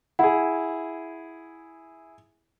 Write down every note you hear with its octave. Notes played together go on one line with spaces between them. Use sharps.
E4 G#4 F#5